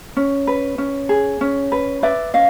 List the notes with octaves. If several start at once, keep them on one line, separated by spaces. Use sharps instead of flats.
C#4
B4
C#4
G#4
C#4
B4
B4 D5 E5
C#4 D#5 F5